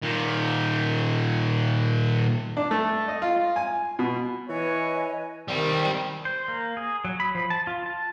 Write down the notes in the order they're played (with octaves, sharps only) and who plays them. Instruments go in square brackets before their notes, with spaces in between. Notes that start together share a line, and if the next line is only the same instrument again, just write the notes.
[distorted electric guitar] A#2 D#3
[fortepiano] D4
A3
D#5
F4
G#5
B2
[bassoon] E3 [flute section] B4 D#5 G#5 [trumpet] C#5
[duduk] D#3 [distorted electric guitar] G3 C4
[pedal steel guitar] C5
A#3
G#4
F#3
B5
F3
A5
F4
A5